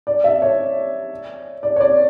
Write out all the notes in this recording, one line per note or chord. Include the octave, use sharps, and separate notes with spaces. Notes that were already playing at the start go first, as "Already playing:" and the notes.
D5
E5
C#5
D5
C#5
D5